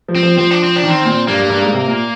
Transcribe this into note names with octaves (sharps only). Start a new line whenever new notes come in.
F3
C4
F3
F3 C4
D4
C4
D4
D#3
C4
A#2
G2 A#3
G2
G2
G#2
C3
A#2